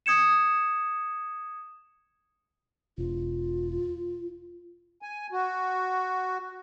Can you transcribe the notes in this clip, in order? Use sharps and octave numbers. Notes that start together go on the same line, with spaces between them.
D#6 G#6 C#7 E7
E1 F4
G#5
F#4